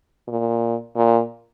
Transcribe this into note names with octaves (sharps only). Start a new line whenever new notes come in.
A#2
A#2